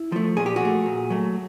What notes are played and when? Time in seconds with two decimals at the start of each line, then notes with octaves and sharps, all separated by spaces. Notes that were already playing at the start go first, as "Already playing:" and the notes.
Already playing: E4
0.12 F3 A3
0.37 A#2 G#4
0.46 G4
0.56 F#4 G#4
0.62 F3 A3
0.86 A#2
1.10 F#3 A3